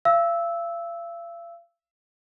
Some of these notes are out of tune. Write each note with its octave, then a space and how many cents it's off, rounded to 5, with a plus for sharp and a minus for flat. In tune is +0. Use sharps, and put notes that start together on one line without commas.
F5 -40 E6 -10